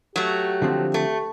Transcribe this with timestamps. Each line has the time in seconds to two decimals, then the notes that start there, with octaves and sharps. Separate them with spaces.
0.16 F#3 A3 G4
0.62 D3 F3 C4
0.94 A3